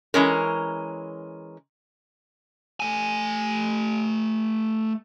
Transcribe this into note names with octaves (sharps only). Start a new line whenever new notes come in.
E3 G#3 C#4 A#4
A3 G#5